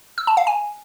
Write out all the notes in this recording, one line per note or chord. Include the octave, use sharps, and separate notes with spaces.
E6
A5
F5
G#5